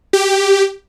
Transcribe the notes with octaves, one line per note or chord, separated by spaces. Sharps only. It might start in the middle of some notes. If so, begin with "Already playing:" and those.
G4